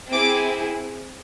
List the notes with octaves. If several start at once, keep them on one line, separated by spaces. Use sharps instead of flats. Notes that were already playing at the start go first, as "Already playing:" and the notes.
C4 E4 G#4 D6